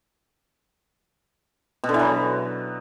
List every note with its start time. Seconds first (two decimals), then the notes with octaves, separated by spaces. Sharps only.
1.84 B2
1.89 D3
1.94 E3
1.99 F#3